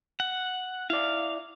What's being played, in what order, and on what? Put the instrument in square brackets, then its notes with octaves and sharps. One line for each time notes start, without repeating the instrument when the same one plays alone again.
[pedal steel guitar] F#5
[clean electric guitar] E4 D5 [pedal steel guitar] F5